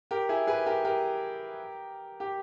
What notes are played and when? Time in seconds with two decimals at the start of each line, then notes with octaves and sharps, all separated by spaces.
0.11 G4 A#4
0.29 E4 G#4
0.47 G#4 B4
0.66 G4 A#4
0.85 G4 A#4
2.20 G4